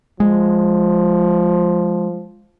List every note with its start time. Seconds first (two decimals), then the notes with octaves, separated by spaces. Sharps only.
0.20 F3 G#3